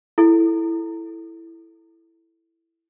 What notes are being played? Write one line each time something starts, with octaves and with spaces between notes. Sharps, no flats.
E4 A4